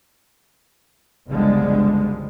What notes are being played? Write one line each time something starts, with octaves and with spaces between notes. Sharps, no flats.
F#1 B1 D3 F3 G3 G#3